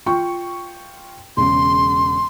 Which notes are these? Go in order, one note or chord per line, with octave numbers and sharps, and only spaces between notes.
F4 G5 C#6
E1 C#3 C6